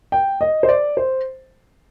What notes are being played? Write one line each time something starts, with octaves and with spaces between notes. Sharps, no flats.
G5
D#5
C5
D5
C5